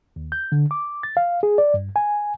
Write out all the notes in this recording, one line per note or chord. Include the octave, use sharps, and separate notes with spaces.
D#2
G6
D3
D6
A6
F5
G#4
D5
G2
G#5